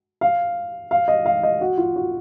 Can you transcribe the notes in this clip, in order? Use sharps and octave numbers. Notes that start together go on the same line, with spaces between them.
F5
F5
D#5
F5
D#5
F#4
F4
F#4